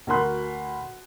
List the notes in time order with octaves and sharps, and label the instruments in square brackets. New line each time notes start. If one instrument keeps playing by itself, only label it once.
[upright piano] D2 F#4 A#4 B5 C6 F#6